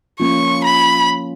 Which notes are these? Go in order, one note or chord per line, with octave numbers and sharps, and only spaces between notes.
F3 A#3 C#4 F4 C#6
B5